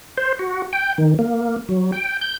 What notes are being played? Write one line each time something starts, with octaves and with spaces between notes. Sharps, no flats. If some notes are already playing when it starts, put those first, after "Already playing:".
C5
F#4
G5
D#3
A#3
F#3
G5
G6